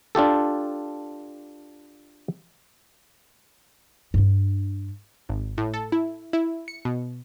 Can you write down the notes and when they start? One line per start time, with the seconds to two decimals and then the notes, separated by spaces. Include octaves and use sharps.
0.15 D4 F4 G4 A4
4.14 G2 D4
5.29 G#1
5.58 A2
5.74 A4
5.92 E4
6.33 E4
6.68 C#7
6.85 B2